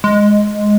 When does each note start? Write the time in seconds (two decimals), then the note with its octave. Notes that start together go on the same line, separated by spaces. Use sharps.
0.04 G#3